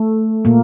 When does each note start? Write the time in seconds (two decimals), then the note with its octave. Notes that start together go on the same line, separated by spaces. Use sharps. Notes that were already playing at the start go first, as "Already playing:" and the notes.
Already playing: A3
0.45 A#2 A#3